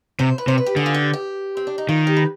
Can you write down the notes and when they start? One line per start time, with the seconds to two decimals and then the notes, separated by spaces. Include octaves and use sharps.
0.19 C3 C5
0.38 B4
0.47 C3 C5
0.58 B4
0.66 G4
0.76 D3 G#4
0.86 F4
0.94 G4
1.13 G4
1.57 C4
1.67 D4
1.78 D#4
1.89 D#3 F4
2.07 G4
2.17 B4